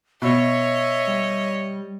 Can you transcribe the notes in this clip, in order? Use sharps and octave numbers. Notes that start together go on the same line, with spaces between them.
B2 C#5 D#5 E5
G3